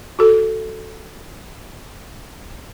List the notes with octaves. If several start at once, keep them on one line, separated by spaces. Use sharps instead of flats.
F#4 A4